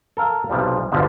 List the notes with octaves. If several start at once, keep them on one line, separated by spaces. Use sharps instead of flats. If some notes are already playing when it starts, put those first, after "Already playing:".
A4 A#4 F5 A#5
B1 C3 F3 G3
G1 E2 G2 B2 D3 F3